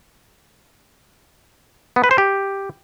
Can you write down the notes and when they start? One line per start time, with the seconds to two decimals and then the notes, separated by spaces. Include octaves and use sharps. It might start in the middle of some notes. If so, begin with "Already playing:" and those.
1.96 B3
2.04 B4
2.11 C5
2.18 G4